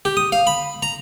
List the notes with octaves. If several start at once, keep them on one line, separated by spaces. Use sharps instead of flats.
G4
D#6
F5
B5
A#5